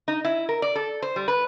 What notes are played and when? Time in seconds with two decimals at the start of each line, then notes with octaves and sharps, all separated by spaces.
0.08 D#4
0.25 E4
0.49 A#4
0.62 D5
0.75 A4
1.02 C5
1.16 G3
1.28 B4